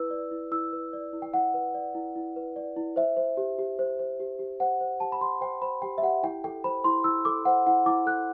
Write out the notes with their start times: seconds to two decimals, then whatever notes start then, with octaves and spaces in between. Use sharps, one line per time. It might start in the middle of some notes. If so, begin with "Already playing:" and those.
Already playing: E4 B4 E6
0.11 D5
0.31 E4
0.52 E4 E6
0.72 B4
0.93 D5
1.13 E4
1.22 G5
1.33 E4 F#5
1.54 B4
1.74 D5
1.95 E4
2.16 E4
2.36 B4
2.56 D5
2.76 E4
2.96 C5 E5
3.17 C5
3.37 G4
3.59 G4
3.79 C5
3.99 C5
4.20 G4
4.39 G4
4.60 C5 F#5
4.81 C5
5.00 G4 A5
5.12 B5
5.21 G4 C6
5.41 C5 G5
5.62 C5 B5
5.82 G4 G5
5.98 E5
6.03 G4 F#5
6.23 E4 G5
6.44 A4 G5
6.64 C5 B5
6.84 E4 C6
7.04 E4 E6
7.25 A4 D6
7.45 C5 F#5
7.67 E4 F#5
7.86 E4 D6
8.06 A4 F#6